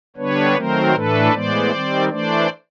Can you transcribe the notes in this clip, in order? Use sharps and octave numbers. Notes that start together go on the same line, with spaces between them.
D3 G3 B3 D4 B4 C#5
D#3 F#3 A3 C4 A#4 C5
A2 E3 A3 D4 A4 B4
A2 E3 G#3 B3 C5 D5
D#3 G3 C4
E3 A3 D4 C5 D5